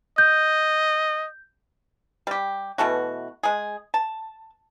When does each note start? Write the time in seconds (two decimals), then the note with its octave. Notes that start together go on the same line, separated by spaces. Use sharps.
0.18 D#5 G6
2.27 G3 G4
2.78 B2 E3 A3 F#4
3.43 G#3 G#4
3.94 A5